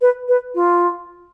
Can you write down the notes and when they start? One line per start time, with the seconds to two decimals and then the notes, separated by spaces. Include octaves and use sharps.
0.02 B4
0.29 B4
0.55 F4